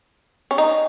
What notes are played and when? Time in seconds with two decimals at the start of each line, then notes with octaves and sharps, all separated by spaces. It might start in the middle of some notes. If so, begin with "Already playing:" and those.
0.51 C#4
0.58 D#4